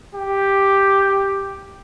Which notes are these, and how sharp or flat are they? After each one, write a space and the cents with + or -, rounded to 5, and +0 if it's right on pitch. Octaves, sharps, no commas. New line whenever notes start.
G4 +0